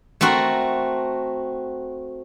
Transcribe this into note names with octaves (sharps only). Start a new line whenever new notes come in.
A3 C4 F#4 A#4